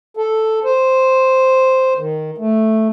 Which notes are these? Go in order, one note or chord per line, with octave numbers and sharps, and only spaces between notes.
A4
C5
D#3
A3